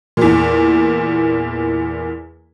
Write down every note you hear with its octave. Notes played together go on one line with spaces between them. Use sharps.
E2 A#2